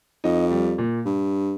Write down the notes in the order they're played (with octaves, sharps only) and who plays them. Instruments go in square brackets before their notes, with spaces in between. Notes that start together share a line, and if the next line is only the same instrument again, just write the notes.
[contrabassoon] F2 [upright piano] D#4
[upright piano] G3
A#2
[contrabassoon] G2